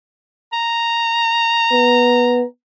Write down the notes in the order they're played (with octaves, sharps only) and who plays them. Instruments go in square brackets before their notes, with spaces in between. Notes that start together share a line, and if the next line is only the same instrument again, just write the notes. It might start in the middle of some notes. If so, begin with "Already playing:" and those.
[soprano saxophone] A#5
[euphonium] B3